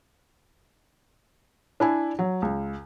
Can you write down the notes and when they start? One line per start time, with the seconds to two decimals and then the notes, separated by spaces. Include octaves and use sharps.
1.80 D4 E4 G#5
2.19 F#3
2.42 C#2